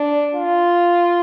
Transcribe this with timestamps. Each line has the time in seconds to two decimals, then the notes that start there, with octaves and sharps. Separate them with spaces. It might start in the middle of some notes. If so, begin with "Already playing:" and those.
Already playing: D4
0.35 F4